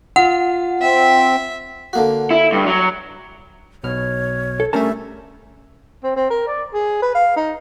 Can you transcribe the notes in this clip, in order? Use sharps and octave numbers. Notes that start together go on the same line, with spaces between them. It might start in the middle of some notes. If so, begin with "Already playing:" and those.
F4 F#5
C4 E5
D3 A#3 F#4
E4
G2
F#3
B1 B2 C#5 F6
A4
G3 A3 C#4 D4 A#4 E5 A5
C4
C4
A#4
D5
G#4
B4
F5
D#4